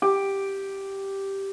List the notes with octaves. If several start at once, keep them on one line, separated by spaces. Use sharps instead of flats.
G4